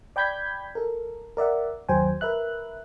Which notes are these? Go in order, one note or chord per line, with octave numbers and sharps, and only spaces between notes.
D5 G5 B5 G6 G#6 B6
A4 A#4
A#4 D5 E5 F#5
G1 D#2 F#3 C5 G5 G#5
A#4 B4 E5 F#6